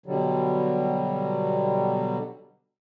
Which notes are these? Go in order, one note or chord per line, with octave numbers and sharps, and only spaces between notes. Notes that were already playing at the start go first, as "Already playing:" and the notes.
B2 D3 F#3 G3